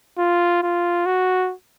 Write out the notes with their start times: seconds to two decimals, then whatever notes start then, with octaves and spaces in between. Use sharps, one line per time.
0.18 F4
0.62 F4
1.06 F#4